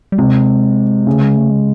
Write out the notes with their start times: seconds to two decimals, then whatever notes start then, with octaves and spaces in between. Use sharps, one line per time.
0.12 G3
0.18 C3 G#3
1.07 C#3 A3
1.21 G#3
1.36 A3
1.51 G#3